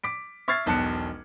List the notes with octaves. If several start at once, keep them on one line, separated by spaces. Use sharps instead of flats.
D6 B6 D7
E5 C#6 F6 G#6 A6 C7
E1 B1 B2 A5 F#6 C#7